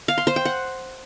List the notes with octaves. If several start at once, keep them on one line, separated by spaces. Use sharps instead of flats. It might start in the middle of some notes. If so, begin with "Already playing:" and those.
F5
C6
C5
G5
F#5